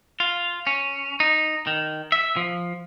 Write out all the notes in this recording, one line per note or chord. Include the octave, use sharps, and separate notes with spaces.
F4
C#4
D#4
D#3
E5
F3